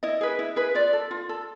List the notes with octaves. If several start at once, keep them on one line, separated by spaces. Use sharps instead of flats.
E4 D#5
G#4 B4
E4
G#4 B4
F4 D5
A4
F4
A4